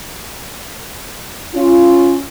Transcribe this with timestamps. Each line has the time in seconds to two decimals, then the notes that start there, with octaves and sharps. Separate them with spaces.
1.55 C#4 F4